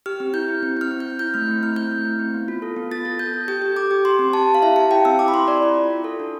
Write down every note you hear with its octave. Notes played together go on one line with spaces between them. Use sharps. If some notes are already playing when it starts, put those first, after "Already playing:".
G4 F6
C4
E4 G6
E4
C4
C4 F6
C4
G6
C4
E4 G6
A3 F6
C4
E4 F6
C4 G6
A3
E4
C4
B3
F4
A4
B3
F4 A6
A4
A4 G6
A4
G4 G6
G4
G4 D6
G4
G4 C6
C4
G4 A5
G4
F5
E4 E5
G4 A5
E4 G5
C4 E6
G4 D6
B5
E4 C6
C4 D5
E4
F4
F4
A4
D4